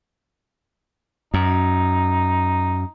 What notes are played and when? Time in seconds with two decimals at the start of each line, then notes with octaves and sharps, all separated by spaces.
1.34 F#2 D#4